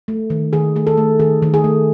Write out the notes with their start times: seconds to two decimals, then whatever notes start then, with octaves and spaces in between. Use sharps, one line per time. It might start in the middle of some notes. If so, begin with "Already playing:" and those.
0.08 A3
0.30 D#3
0.53 D#3 G#4
0.76 A3 G#4
0.87 A4
0.97 A3
1.19 D#3 G#4
1.42 D#3
1.54 G#4
1.64 A3